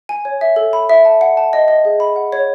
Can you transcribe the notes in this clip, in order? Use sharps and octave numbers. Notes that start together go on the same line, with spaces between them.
G#5
C#5
E5
A4
B5
E5
A5
F#5
A5
D#5
D#5
G#4
B5
F#5
C#5